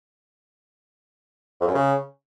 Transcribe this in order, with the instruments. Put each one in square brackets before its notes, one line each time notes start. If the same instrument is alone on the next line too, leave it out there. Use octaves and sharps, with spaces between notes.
[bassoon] F2
F#2
C#3